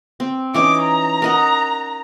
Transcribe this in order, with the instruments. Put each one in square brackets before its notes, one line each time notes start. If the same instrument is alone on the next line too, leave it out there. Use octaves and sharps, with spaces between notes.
[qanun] C4
[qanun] E3 C#4 D#4 [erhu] D6
[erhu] A#5
[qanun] A#4 D#5 F#5